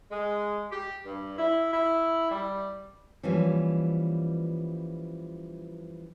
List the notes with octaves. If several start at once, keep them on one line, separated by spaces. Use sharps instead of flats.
G#3
G4
G2
E4
E4
G3
E3 F3 G3 A#3 C#4 F4